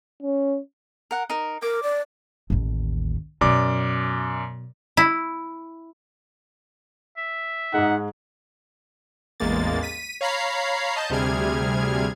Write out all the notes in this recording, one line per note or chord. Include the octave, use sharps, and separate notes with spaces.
C#4
A#4 F#5
D#4 A#4
A#4 D6
D5
A1 D#2
F#2 B2 F#3 D5 D6
E4
E5
G#2 G#3 D#4 F#5
A1 E2 G#3 A#3 A6
B6 D#7
C#5 F5 A#5 B5 C7
D#5 A5 G6
D2 C3 G3 G#4 F6 G#6